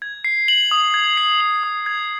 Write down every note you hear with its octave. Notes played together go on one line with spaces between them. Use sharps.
G#6
C7
F#7
D#6
G#6
C7
F#7
D#6
G#6